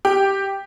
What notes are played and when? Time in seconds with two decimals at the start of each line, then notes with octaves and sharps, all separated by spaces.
0.05 G4